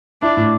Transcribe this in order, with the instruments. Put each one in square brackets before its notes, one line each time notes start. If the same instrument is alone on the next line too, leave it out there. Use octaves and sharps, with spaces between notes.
[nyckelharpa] D4 [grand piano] E4
[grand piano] A2